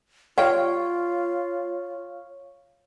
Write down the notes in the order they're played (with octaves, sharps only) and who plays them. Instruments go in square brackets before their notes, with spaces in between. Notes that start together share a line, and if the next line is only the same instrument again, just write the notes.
[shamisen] G3 G5 [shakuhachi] F4 [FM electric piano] C#5 F5